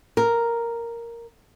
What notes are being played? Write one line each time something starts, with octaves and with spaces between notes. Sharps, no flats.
A#4